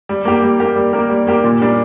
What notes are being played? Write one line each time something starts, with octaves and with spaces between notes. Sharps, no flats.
G3
A#3 G4 A#4
G3
A#3 G4 A#4
G3
A#3 G4 A#4
G3
A#3 G4 A#4
A#2
G3 D4 A#4 D5